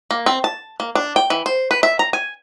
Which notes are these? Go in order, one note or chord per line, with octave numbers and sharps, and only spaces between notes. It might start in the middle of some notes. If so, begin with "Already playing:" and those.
A#3
C4
A5
A#3
D4
G5
E3
C5
B4
E5
A#5
G#5